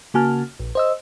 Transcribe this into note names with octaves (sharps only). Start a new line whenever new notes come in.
C#3 A#3 F#4 G#5 A5 F6
A#1
C5 D#5 E6